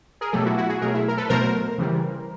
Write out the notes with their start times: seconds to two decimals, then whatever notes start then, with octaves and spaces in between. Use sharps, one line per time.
0.21 G#4 A#4
0.33 B2 F#3 A3 G4 A4
0.45 E4 F#4
0.58 E4 F#4
0.69 F#4 G#4
0.81 B2 F#3 A3 G#4 A#4
0.94 E4
1.08 A#4
1.17 A4 B4
1.29 B2 F#3 A3 A#4 C5
1.78 C#3 E3 G3